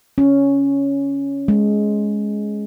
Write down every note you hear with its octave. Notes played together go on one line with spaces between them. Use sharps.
C#4
G#3